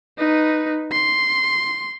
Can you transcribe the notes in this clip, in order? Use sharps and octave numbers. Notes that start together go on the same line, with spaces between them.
D#4 B4
C6